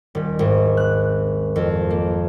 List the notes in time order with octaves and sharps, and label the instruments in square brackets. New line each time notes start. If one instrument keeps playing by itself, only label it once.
[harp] D#1
G#1
F#6
F2
A#3